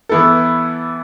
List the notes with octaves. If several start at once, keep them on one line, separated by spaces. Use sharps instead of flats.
E3 B3 E4 A4